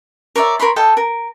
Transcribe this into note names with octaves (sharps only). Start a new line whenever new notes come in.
A#4 C#5 D5 E5
A#4 C#5 B5 C6
A4 D#5 G5 A5
A#4